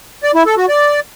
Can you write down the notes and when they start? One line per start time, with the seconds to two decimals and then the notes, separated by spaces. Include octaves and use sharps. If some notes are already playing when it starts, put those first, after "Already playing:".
0.24 D5
0.35 E4
0.46 A4
0.57 F#4
0.69 D5